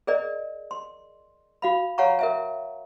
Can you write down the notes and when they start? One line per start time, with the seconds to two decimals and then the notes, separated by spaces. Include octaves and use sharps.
0.07 G#4 A#4 D5 D#5
0.71 C6
1.62 F#4 F5 B5
1.98 C#5 F5 F#5 G#5 A#5 C#6
2.19 A#4 E5 G#5